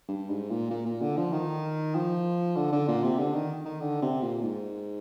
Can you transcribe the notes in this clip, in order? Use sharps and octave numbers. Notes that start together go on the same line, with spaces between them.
G2
G#2
A#2
A#2
A#2
D3
F3
D#3
F3
D3
D3
A#2
C3
D3
D#3
D#3
D3
C3
A#2
G#2